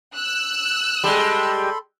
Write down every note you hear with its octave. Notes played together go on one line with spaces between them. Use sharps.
E6 F#6
G3 G#3 A4 B5 C6